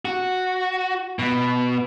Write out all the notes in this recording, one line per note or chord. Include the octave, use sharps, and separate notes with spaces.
F#4
B2